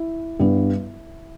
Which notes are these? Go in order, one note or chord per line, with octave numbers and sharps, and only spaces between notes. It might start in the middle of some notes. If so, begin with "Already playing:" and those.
Already playing: E4
G2 G3 B3